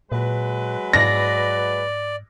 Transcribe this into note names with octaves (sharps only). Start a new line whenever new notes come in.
A#2 F#3 G#3 B4
G#2 D5 A#6